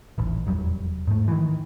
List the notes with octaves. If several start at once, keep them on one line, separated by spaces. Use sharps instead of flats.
D#1 A1
F1 E2 F#3 G3
G#2 A3
D#3 E3